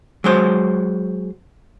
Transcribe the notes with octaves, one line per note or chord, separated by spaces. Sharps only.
F#3 G#3 C5